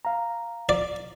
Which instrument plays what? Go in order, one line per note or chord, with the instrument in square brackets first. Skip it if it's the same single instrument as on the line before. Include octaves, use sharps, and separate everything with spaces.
[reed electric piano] F5 A#5
[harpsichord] D5